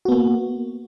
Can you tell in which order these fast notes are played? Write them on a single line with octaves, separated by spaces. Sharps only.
F#4 B3 A#3